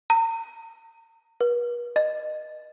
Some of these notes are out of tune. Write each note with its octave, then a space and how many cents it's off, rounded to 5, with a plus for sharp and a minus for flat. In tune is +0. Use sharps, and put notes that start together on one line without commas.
A#5 -40
B4 -45
D#5 -25